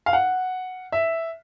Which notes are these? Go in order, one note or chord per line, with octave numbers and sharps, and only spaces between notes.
F5
F#5
E5